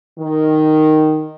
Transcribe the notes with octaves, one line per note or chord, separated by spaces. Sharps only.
D#3